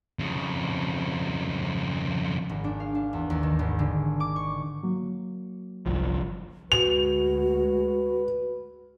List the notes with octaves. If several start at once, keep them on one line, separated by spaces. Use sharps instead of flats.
F2 C#3
G#1
D4
F5
D4
E2
D#2
D#3
G#1
D3
D6
C#6
F#3 A#3
G1 C2 F3
D2 G#3 F#4 B4 F7